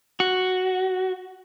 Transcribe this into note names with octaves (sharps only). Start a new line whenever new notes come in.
F#4